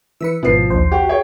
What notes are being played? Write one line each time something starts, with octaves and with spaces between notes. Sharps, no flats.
E3 B4 E6 B6 C#7
G#1 B2 F3 E4 B4 C7
A#1 D#2 C5
F#4 G4
G#4 C#5 G5